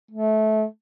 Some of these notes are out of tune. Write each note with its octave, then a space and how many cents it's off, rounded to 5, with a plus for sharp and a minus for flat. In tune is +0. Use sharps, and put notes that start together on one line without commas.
A3 -20